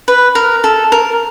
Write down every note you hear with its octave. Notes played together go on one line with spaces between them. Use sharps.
B4
A#4
A4
A#4